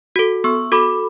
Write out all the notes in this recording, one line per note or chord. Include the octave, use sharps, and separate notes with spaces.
F#4 A4
B3 C#6 E6
F#4 A4 B5 D6